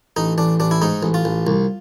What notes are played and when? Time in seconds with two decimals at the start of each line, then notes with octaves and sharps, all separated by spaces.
0.16 A1 D#4
0.38 A1 D4
0.60 A1 D4
0.71 E4
0.82 G#2 D#4
1.03 A1
1.14 F4
1.25 A1
1.47 C2